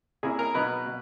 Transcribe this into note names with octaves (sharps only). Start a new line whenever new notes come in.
A#2 A#3 C#4 E4 G#4
A#4
B2 F#3 B3 D#4 B4
B2